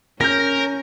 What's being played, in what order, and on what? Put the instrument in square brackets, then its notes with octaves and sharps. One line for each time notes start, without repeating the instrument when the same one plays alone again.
[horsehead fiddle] C#4 [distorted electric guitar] A#4 [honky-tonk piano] G6 A#6